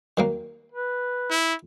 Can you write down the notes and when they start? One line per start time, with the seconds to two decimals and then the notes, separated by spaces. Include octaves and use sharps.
0.17 D#3 F#3 A#3
0.72 B4
1.30 E4